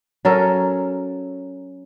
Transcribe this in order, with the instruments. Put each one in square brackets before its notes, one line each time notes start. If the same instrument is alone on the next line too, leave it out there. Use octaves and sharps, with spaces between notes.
[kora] F#3 C#4 A4 A#4